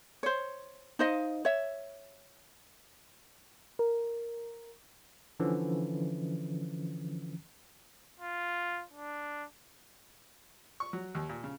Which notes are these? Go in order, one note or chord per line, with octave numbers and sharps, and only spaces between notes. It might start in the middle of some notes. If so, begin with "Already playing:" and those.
C5 C#5
D#4 C5 D#5 F5
C#5 E5
A#4
D3 E3 F3 C#4
F4
D4
C#6
F#3
D#2
A#2
C#3